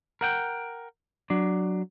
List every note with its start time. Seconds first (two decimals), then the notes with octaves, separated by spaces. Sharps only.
0.21 A#4 F#5 G5
1.30 F#3 D4